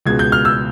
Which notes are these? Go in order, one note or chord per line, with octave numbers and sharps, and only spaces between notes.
C#2 B2 G#3 G#6
G6
F6
E6